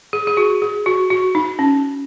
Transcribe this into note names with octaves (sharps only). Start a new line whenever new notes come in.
G#4
G#4
F#4
G#4
F#4
F#4
D#4
C#4